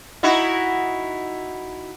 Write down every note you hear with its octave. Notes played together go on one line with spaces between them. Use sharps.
D#4 E4 F#4